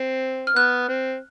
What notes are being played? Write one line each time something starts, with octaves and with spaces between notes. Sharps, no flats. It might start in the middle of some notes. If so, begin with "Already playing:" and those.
Already playing: C4
F6
B3 F#6
C4